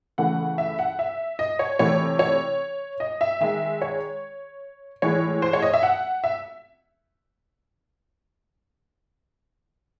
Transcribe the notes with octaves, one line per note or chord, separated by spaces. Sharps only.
C#3 E3 A3 F#5
E5
F#5
E5
D#5
C#5
C3 E3 A3 C#5
C#5
D#5
E5
D#3 G#3 E5
C#5
A2 E3 G#3 C#5
C5
C#5
D#5
E5
F#5
E5